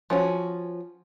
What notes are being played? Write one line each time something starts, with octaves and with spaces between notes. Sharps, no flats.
F3 C#4 F#4